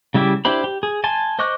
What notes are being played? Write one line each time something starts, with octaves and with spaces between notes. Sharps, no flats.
C#3 G3 E4 G4 E5
D4 E4 G4 C5 B5
G4
G#4
G#5 A5 C6
C5 D#5 C#6 D6 F#6